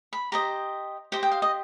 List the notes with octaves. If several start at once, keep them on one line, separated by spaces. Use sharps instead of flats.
B5
G4 C5 D#5 A#5
G4 C5 D#5 G5
G5
F5
D#5